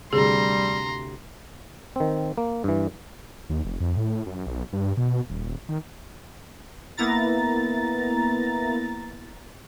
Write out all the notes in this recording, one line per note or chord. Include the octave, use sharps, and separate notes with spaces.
D2 C3 G3 G#4 A#5 C6
D#3 C4
A#3
G2 E3
D#2
F1
F2
A2
F#2
B1
G2
B2
D#1
D#3
A#3 B3 E4 A#5 A6